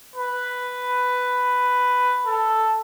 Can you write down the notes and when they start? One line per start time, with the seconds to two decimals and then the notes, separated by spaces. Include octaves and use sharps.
0.16 B4
2.26 A4